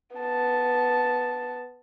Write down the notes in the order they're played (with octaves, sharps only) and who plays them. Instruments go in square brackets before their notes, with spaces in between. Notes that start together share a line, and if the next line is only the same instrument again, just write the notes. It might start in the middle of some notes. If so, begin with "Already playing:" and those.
[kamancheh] B3 A5